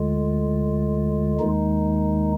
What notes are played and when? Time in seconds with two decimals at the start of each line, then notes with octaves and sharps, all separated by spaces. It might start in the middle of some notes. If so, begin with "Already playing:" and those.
Already playing: D2 D3 G#3 F4
1.39 D#2 D#3 G#3 D#4